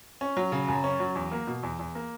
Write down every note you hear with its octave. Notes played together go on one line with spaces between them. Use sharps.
C#4
F#3
C#3
F#2
C#4
F#3
E2
A#3
B2
E2
E2
A#3